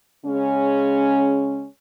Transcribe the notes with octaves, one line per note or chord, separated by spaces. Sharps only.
C#3 G#3 C#4